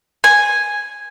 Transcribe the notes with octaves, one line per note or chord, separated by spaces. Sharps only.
G#5